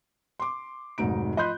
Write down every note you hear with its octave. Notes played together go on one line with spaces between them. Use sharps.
C6 D6
F1 G#2 F#3 D#4 D7
F3 D#5 B5 C6 F#6 G6